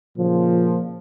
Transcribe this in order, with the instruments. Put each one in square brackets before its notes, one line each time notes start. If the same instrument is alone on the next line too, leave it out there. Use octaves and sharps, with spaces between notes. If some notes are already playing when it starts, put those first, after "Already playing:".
[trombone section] A#2 C#3 F3